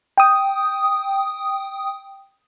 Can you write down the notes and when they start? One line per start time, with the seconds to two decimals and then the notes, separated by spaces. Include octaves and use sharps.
0.18 G5 D#6